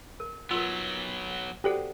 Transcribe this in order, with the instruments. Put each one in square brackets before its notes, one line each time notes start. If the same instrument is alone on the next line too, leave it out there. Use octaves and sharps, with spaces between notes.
[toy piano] A#4
[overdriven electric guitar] F#3 B3 [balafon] F4 [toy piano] A#4 E6
[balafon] F#4 B4 D5 [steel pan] G4 [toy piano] A4 C5 F#5